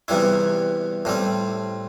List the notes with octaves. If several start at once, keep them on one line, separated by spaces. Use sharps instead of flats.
E2 C3 E3 G3 E4
A2 G3 C4